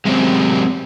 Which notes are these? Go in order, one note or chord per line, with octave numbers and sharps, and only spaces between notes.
F#2 C3 G#3 C4